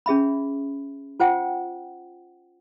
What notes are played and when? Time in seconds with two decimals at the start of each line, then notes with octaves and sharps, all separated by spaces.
0.06 C#4 G#4 E5 B5
1.20 F4 C5 F#5 G5